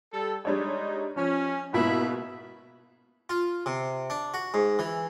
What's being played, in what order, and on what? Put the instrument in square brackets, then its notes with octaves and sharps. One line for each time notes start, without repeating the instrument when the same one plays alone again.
[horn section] G3 A4
[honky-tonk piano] G3 D4 C#5 [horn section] G#3 D#4
[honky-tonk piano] F3 [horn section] C#4
[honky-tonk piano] G#2 B2 A#3 [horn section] E4 B5
[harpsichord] F4
C3
D4
F#4
G#2
E3